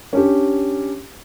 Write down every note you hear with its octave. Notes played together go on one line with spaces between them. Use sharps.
C#4 D4 G4